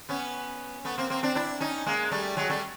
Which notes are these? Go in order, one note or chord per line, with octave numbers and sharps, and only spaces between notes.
B3 C#4
A3 B3
A#3 C4
A#3 C4
C4 D4
D4 E4
C#4 D#4
G#3 A#3
G3 A3
F#3 G#3
G3 A3